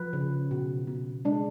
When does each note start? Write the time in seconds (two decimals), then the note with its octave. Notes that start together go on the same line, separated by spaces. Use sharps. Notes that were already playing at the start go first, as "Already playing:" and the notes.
Already playing: F3 B4
0.13 C#3
0.51 B2
0.87 B2
1.25 G#3 D4